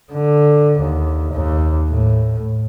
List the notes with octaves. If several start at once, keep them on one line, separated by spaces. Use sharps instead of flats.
D3
D#2
D#2
A2